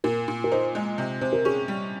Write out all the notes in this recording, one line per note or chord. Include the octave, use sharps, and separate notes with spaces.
A#2 A#4
A#2
A#4
D#4 C5
G#3
C3
C3 C5
A#4
C#4 G#4
G3